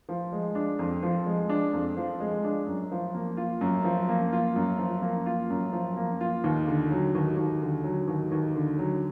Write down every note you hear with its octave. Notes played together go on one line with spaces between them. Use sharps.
F3
G#3
D4
F2
F3
G#3
D4
F2
F3
G#3
D4
F#2
F3
A#3
F4
F#2
F3
A#3
F4
F#2
F3
A#3
F4
F#2
F3
A#3
F4
D#2
D3
F#3
D#2
D#2
D3
F#3
D#2
D#2
D3
F#3